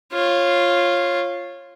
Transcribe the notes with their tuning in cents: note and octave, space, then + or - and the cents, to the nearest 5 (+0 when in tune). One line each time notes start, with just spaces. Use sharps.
F4 +0 C#5 -20